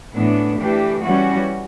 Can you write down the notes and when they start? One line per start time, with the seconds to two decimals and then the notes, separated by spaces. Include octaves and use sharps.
0.14 A2 E3 B3 D4
0.57 E3 A3 D4 G4
1.01 E3 G3 C#4 F#4